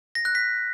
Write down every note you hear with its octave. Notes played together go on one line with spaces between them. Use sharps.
A#6
F#6
B6